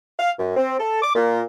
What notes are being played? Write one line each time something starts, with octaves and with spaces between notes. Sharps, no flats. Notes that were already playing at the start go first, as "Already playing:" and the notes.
F5
F#2
C4
A4
D6
A#2